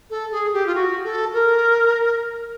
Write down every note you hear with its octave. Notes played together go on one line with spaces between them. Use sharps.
A4
G#4
G4
F4
F#4
A4
A#4